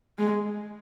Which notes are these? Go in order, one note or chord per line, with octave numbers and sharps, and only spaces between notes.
G#3